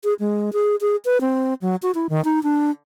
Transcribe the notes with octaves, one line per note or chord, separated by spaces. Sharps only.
G#4
G#3
G#4
G#4
B4
C4
F#3
F#4
E4
D#3
D#4
D4